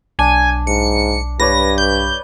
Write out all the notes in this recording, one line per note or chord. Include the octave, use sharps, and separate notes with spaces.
B1 D4 G#5
G#2 C#7
G2 B4 C#5 D5 A#6
G6